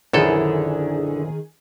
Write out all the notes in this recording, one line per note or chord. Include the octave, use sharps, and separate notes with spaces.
A#1 F#2 D3 D#3 D4 E4 G#4 A4